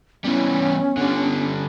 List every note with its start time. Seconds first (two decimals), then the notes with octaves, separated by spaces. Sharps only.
0.25 E3 G3 B3 C#4
0.97 D3 G3